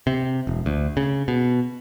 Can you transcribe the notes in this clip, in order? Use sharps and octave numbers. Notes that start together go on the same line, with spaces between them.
C3
E1
D2
C#3
B2